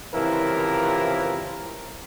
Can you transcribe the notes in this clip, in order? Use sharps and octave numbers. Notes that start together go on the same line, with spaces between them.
C#2 C3 E3 F3 E4 A#4